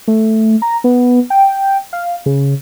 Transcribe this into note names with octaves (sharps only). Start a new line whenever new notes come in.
A3
A#5
B3
G5
F5
C#3